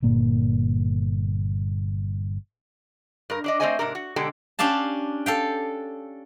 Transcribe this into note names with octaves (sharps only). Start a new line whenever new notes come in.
G1 A#2 A#3
G2 A#4
D4 D5 D#5
A3 C4 C5 D5 D#5 G#5
G#2 C3 D4 A#4
F#4
B2 D3 G#3 G4 A4
C#4 D4 G4 F5 A5
A4 F5 G5